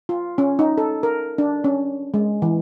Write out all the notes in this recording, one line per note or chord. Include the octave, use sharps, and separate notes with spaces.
F4
C#4
D#4
A4
A#4
D4
C#4
G#3
E3